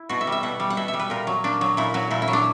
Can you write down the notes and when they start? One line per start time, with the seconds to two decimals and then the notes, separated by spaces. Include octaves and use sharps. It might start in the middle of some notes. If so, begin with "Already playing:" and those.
Already playing: E4
0.09 B2 F#4
0.21 E5
0.27 G3
0.32 E5
0.43 B2 F#5
0.60 G3
0.70 F#5
0.77 B2 E5
0.88 E5
0.94 G3
0.99 B4
1.10 A#2 A#4
1.27 F#3
1.44 A#2 D4
1.61 F#3
1.77 A#2 E4
1.94 F#3 F#4
2.11 A#2 E4
2.22 E4
2.28 F#3
2.33 D4